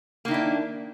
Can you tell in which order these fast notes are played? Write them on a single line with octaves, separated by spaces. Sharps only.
A#3 D#3 E4 D4